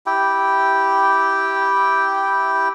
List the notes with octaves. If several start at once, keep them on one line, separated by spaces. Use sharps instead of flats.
E4 G4 G5